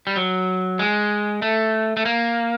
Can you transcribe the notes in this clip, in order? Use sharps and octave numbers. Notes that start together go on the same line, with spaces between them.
G3
F#3
G#3
A3
A3
A#3